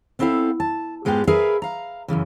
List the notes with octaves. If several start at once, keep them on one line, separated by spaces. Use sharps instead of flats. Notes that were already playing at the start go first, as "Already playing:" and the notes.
B3 C4 E4 A4 F5
A5
G#2 G#3 B3 F4 G4
G#4 A#4 B4 E5 F5
F5 A#5
F#2 A#2 C#3 E3